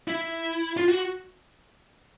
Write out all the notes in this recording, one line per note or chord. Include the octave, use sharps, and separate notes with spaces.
E4
F4
F#4